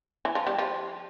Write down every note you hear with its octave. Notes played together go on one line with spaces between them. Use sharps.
E3 E4
F3 F4
G3 G4
F3 F4